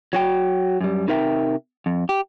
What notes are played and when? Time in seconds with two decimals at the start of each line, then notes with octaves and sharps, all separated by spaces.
0.13 F#3 F#4 G5
0.81 F#2 G3
1.08 C3 D#4 A#4 E5 G5
1.86 F2
2.09 G4